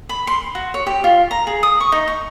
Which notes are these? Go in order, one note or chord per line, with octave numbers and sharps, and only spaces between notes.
B5
C6
F#4
C#5
G4
F4
A#5
G#4
D#6
C#6
D#4
C#6